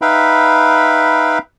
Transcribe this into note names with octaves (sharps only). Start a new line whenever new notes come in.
D#4 B4 E5 F5 G5 B5